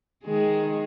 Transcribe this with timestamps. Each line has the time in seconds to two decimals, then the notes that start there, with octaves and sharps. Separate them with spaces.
0.24 D#3 G#3 G#4